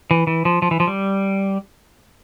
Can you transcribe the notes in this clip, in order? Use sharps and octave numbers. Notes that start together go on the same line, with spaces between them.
E3
E3
F3
F3
E3
F3
G3